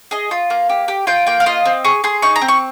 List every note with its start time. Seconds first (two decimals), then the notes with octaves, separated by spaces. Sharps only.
0.11 G#4 D#5
0.31 F4
0.50 A#3
0.69 G4
0.88 G4
1.07 F4 G5
1.27 A#3 G5
1.40 F5
1.46 F4 D#5
1.66 C4
1.84 G#4 C#6
2.04 G#4 C6
2.22 D#4 C#6
2.36 A#5
2.42 C4
2.48 C#6